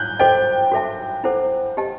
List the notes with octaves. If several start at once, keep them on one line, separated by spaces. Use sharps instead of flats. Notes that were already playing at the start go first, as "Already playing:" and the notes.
Already playing: F#6 G6
F#4 A4 C5 D#5 G5
F#4 A4 E5 A5
E4 A4 C5 F#5
G4 D#5 A5